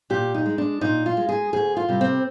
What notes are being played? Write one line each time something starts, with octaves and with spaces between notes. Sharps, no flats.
A#2 G4
D#4
G#3
D4
A#2 D#4
F4
G#3
G#4
D2 G#4
F4
C3 G3
C4